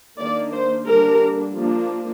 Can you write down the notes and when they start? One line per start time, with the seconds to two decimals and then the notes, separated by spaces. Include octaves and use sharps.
0.19 D#3 A#3 D4 D5
0.53 C5
0.87 D3 G3 A#3 D4 A#4
1.55 F3 A#3 D4